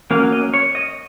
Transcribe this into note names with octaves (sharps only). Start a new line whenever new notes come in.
F#3 A#3 C#4 F5
D#5
C#5
D#5